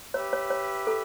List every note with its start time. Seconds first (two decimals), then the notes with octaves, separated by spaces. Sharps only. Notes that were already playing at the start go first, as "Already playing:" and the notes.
0.14 G4 B4 C#5 E5
0.33 C#5
0.50 C#5
0.87 A4